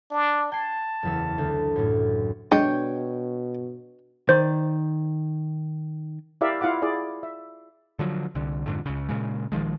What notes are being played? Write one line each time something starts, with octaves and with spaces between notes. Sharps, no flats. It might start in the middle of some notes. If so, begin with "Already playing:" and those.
D4
G5 A5 G#6 C7
F#1 E2 E6
D2
F#2 A2
B2 G#3 D4 C#5 G5
D#3 C5 D5
E4 G4 A#4 D5 E5 F5
E4 F4 F5 F#5 D6
E4 G#4 D5
E5
D3 F3 F#3
C2 D3
F2 G#2 D3
C#2 C#3
A#2 C#3 G#3
A#1 D#3 F3 G#3